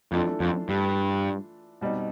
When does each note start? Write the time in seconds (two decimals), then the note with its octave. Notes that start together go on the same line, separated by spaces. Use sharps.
0.12 F2 E3 A3 D4 F4 A4
0.40 F2
0.69 G2
1.81 B2 G3 C4 D#4